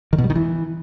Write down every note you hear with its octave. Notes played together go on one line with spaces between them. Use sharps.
D#3
B2
G3
D#3
E3